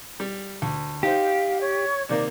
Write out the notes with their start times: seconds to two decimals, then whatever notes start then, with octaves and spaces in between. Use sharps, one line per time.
0.20 G3
0.62 D2
1.03 D#4 G4 C5 F5
1.61 C#5
2.09 C3 D#3 A#3 D5